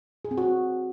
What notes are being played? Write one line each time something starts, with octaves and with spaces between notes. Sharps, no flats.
G#4
C4
F#4